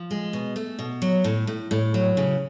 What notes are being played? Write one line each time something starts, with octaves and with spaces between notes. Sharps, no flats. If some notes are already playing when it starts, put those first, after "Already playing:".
Already playing: F3
G#3
B2
A3
B2
F#3
A2
A2
A2
F#3
C#3